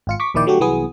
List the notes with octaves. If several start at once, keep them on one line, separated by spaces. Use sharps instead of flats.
G#1 F4 C#7
C#6 D6 B6
A#1 D#2 D#3 E4 D5 G5
D3 F#3 A3 F#4 G4
C2 E3 F#3 B3 G#4 D#6